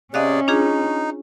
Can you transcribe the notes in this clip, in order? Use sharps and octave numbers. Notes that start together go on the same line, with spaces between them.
C3 C#4 G#4 D5 D#5 F5 F#6
D4 D#4 F4 G#4